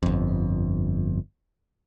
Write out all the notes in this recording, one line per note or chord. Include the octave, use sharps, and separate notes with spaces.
G1 F2